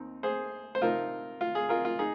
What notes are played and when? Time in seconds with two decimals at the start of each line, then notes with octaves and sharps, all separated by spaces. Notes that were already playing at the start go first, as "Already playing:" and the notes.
Already playing: D#2 C4 D#4
0.23 G#4 C5
0.75 C5
0.82 C3 F3 C4 D#4 F4 A#4
1.41 F4
1.55 G#4
1.69 F4 A#4
1.85 F4
1.99 D#4 G#4